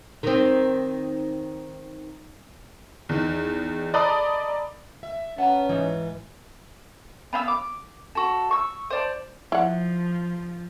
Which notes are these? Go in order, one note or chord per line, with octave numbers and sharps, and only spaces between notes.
D#3 C4
E2 D#3
A4 D5 D#5 A#5 B5 D#6
E5
B3 C#4 F#5 A5 A#5
G#2 E3 D#4
B3 F5 G5 E6
D6
F#4 A4
C#6 E6
C5 D5 A5
F3 E4 F#5